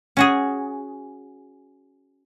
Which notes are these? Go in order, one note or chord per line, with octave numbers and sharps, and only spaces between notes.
C#4 F#4 G#4